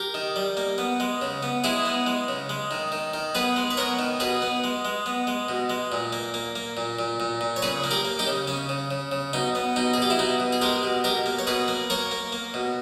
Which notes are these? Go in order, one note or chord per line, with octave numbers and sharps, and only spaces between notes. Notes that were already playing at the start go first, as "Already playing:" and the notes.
Already playing: G4 A#4
D#3
G3
A#3
B3
G#3
C#3
B3
G#3 E4 G#4
B3
G#3
C#3
G#3
D#3
D#3
D#3
B3 G#4 B4
G#3
B4
B3 A#4 C#5
D#3
B2 G#4 B4
B3
G#3
G#3
B3
G#3
B2
G#3
A#2
A#3
A#3
A#3
A#2
A#2
A#2
A#2
C#5
C#3 G#4 B4
A#3
G4 A#4
A#3
D#4 G4
C#3
C#3 C#4
C#3
C#3
C#3
B2 D#4
B3
B2 D#4
G#4
B2 G4
E4
B2 D#4
B2
G#4
G#3 G4 A#4
B2
B2 G4 A#4
A#3
C#5
B2 G#4 B4
A#3
A#3 A#4 C#5
A#3
A#3
B2